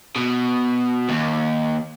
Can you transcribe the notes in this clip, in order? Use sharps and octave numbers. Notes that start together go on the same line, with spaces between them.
B2
D#2